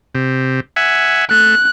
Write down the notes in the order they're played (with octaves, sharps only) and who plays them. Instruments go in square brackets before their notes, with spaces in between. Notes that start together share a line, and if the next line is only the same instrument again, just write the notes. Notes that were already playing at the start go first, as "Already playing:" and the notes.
[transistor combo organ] C3
E5 F#5 G#5
[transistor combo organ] A3 [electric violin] F#6